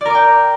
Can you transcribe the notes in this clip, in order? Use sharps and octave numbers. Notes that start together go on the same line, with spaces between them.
A#4 D5 G5 D6